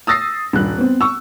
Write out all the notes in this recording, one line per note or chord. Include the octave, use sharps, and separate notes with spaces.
D#6 E6 A6 A#6 C7
D#1 G2 F#6
B3 C4
C#6 E6